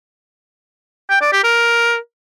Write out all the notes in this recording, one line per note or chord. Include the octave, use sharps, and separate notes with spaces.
G5
D5
G4
A#4